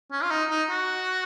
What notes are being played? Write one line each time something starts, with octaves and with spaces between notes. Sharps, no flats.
C#4
F4
D#4
D#4
F#4